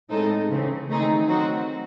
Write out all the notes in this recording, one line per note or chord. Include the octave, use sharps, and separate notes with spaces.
A2 G#3 C4 D#4 A4
C#3 E3 C4
D#3 A3 C4 D#4 G#4
F#3 C4 D#4 F#4